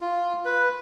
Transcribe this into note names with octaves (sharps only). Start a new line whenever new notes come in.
F4
B4